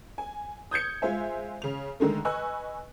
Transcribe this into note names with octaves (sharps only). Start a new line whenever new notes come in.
G#5
D#6 G6 G#6 C#7
G#3 F4 C5 E5 G#5
C#3 F7
D3 D#3 G#3 A3
B4 D#5 G#5 C#6 E6 F#6